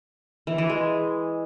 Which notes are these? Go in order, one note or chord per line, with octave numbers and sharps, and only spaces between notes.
E3
E3
G#3